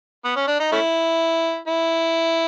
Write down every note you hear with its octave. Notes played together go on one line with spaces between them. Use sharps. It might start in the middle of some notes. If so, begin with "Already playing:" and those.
B3
C#4
D4
D#4
A3 C#4 E4
E4